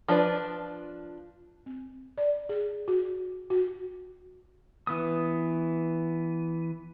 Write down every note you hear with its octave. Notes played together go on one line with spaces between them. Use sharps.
F3 D4 F4 B4 D5
C4
D5
G#4
F#4
F#4
E3 B3 D#6